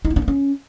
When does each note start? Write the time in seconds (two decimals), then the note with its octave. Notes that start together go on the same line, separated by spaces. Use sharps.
0.05 D#4
0.10 B3
0.16 D4
0.22 B3
0.28 C#4